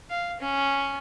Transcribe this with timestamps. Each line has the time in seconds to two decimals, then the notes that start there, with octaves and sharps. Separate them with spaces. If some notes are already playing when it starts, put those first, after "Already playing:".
0.10 F5
0.40 C#4